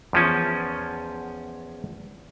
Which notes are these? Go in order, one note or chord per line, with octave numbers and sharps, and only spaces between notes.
E2 F3 C#4